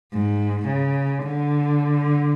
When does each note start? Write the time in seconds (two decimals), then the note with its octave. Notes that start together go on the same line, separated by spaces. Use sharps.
0.13 G#2
0.68 C#3
1.23 D3